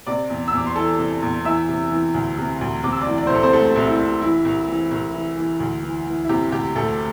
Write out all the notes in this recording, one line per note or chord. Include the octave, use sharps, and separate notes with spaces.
C3 D5 D6
E2
E6
E2 D6
C6
E3 A4 A5
C3
E2
E3 E5 E6
C3
E3
D2
C3
D2
C3 D6
E6
D5 D6
E3
D5
C2 C5
A4
C4 C5
C2 A3 A4
C2
E4
C2
E3 E4
C2
E3
C2
E3
E3
D2
E3
E3
E4
C3 G4
D2 G4
D2 A3 A4